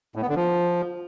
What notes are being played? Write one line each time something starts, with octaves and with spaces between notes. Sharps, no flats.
A2
B3
D3
F3